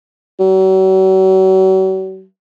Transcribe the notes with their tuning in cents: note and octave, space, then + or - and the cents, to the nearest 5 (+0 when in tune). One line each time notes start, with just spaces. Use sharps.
F#3 +40